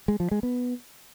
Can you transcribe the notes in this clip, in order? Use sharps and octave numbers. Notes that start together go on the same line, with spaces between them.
G#3
F3
G#3
B3